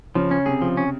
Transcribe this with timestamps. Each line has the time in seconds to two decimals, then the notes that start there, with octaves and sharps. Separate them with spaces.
0.15 C#3 F3
0.31 C#4
0.46 C3 G#4
0.62 F3
0.77 C#4